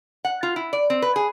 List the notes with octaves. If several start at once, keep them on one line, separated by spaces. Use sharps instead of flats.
F#5
F4
E4
D5
C4
B4
G#4